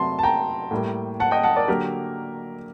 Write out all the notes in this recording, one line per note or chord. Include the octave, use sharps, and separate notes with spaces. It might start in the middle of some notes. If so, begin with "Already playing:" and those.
Already playing: C3 F#3 A3 A5 C6
A5
G5 A#5
A2 G3 A#3
F#5 A5
D#5 G5
F#5 A5
A#4 D5
D3 F#3 A#3 G4 A#4